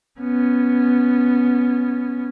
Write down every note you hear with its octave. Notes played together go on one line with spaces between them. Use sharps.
B3 C#4